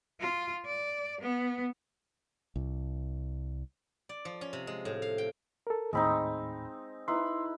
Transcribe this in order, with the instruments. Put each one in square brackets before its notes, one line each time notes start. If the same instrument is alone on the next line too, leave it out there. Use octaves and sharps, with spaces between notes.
[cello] F4
D5
B3
[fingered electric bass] C2
[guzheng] D5
F3
C#4
C3
G#3
A2
F5
G5
[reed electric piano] A4 A#4
[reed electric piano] D#2 A2 B5 [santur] G#3 C4 D#4
[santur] D#4 E4 B4 [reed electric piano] C6